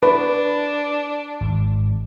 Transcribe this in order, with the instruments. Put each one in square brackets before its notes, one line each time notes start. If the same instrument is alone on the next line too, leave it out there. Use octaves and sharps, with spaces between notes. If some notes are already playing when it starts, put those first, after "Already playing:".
[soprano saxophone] D4 [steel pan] B4
[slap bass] G#1